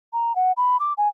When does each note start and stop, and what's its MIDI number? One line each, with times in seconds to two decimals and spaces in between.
0.13 0.35 82
0.36 0.52 78
0.57 0.77 83
0.80 0.93 86
0.98 1.08 80